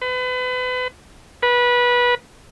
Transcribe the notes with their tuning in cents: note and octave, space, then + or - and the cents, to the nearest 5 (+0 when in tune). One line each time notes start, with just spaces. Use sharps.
B4 +35
B4 -20